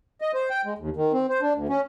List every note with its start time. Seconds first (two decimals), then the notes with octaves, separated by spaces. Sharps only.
0.21 D#5
0.34 C5
0.50 G5
0.65 G#3
0.78 D#2
0.97 D#3
1.13 C4
1.29 C5
1.42 D4
1.55 D2
1.69 C#4